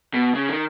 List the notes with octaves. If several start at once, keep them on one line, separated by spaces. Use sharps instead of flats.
B2
C#3
D#3